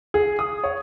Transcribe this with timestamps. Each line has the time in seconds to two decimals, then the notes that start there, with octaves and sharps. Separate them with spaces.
0.14 G#4
0.39 D#6
0.64 C#5